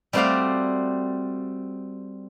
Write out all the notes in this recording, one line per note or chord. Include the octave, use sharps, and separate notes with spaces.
G3 A3 C4 F#4 D5 F5